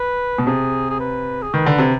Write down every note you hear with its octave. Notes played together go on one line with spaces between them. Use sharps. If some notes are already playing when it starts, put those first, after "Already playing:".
Already playing: B4
B2
C3 G#4
G#4
B4
G#4
D#3 B4
D3
C3